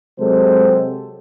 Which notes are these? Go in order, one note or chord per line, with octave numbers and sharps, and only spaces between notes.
C3 F#3 G#3 C4 A4 C5